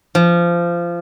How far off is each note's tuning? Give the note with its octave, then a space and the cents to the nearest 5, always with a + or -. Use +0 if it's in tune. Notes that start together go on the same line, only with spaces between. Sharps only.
F3 -20